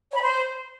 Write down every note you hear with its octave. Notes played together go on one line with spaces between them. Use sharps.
C#5
B5
C5